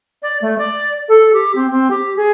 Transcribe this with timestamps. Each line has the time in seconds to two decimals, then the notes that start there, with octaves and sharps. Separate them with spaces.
0.22 D5
0.41 A3
0.58 D5
1.08 A4
1.33 G4
1.55 C4
1.70 C4
1.90 G4
2.16 G#4